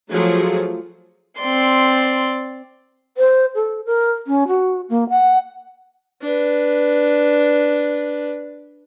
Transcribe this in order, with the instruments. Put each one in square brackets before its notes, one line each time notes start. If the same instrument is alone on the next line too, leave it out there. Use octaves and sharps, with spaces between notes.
[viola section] F3 F#3 A3 G#4
[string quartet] C4 D5 C6
[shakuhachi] C5
A4
A#4
C#4
F#4
A#3
F#5
[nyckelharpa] D4 B4